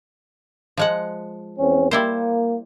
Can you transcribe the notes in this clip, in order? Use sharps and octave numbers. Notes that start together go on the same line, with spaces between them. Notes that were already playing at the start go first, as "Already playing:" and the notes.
F3 G#3 F#5
E2 C4 C#4
G3 A#3 E4 C5